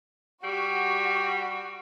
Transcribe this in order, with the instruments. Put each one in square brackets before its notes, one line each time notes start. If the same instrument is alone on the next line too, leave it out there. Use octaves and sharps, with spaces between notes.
[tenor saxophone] G3 [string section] F#4